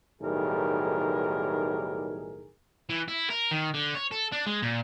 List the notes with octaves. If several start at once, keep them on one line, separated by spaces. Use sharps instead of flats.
B1 A2 D#3 G3 G#4 A#4
E3
E4
A#4
D#3
D3
C#5
A4
D4
G#3
A#2